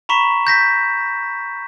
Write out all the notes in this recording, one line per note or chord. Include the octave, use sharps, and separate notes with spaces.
A#5 B5 C#6 B6 E7
G6 A#6 B6